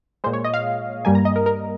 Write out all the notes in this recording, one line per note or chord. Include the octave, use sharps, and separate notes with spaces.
A#2 G#3 C5
C#5
D#5
F5
G2 G3 A#3 G#5
A#5
D#5
A#4
A#4